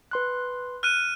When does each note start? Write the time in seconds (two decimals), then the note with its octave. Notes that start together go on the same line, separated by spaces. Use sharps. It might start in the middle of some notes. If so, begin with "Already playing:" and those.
0.11 B4 C6 F#6
0.83 F6 F#6 D#7